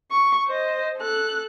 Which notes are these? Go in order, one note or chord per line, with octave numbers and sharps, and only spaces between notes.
C#6
C5 D#5
A4 F#6